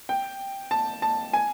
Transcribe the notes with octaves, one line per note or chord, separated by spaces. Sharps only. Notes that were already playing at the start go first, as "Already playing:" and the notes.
G5
A5
A5
G#5